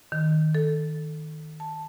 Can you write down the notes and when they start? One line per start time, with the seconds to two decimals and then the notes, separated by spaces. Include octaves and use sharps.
0.12 D#3
0.55 A4
1.60 A5